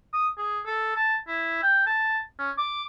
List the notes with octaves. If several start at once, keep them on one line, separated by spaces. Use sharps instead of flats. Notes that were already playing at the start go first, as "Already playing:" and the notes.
D#6
G#4
A4
A5
E4
G5
A5
C#4
D6